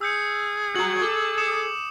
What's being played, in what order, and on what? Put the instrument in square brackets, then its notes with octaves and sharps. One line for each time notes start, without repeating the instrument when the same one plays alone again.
[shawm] G#4 [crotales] E6 G6 C#7
[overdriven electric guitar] F#4 A#5 [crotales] F#7
[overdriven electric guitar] A4 [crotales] D6
[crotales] D#6 C#7 E7